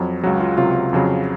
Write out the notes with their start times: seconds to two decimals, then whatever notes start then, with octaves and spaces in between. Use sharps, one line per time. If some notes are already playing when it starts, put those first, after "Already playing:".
Already playing: F2 F#3
0.23 C#2 C#3 F#3 F#4
0.40 F4
0.58 C#2 C3 F#3 F4
0.93 F2 C#3 F#3